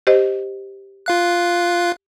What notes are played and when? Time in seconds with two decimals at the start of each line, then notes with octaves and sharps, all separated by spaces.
0.07 G4 C5 D#5
1.06 F4 F5 F#6